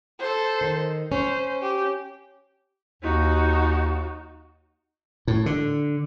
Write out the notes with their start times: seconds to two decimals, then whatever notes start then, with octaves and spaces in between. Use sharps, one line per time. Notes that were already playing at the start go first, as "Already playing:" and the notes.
0.19 A4 C5
0.61 D#3
1.12 C#4 C5
1.62 G4
3.03 D#2 D#4 F#4
5.27 A2
5.46 D3